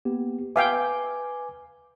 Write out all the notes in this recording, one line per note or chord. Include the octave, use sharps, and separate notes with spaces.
A#3 B3 G4
B4 E5 F5 G5 G#5 D6